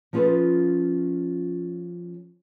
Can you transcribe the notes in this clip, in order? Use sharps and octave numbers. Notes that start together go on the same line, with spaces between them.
F3 C#4 F4 G#4 A4 B4